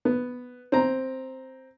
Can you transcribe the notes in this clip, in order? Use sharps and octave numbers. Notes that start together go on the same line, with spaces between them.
B3
C4 A#5